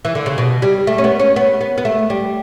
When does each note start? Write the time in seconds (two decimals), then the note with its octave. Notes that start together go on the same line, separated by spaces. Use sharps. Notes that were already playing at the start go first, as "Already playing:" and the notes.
0.05 E3
0.15 D3
0.26 C#3
0.38 B2
0.62 G3
0.87 A3
0.98 C#4
1.04 B3
1.20 C#4
1.36 B3
1.61 B3
1.78 B3
1.85 A3
2.10 G3